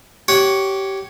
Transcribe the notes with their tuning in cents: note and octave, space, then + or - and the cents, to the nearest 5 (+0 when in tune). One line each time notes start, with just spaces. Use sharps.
G4 -20 C#5 +0 F#5 +0